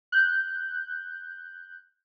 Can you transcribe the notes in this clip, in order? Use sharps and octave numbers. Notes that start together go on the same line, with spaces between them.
F#6 G6